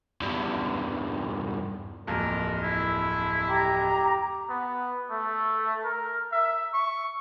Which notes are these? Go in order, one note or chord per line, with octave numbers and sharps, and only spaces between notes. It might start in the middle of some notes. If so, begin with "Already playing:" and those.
E2 G2
D1 F2 A#3 A#4
E4
G4 A#5
B3
A3
A#4
E5
C#6